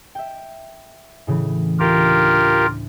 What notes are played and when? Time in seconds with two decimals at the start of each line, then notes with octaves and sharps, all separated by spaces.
0.15 E5 G5
1.27 A2 C#3 E3
1.79 D2 F4 G4 A#4